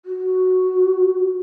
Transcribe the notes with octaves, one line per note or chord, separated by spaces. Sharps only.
F#4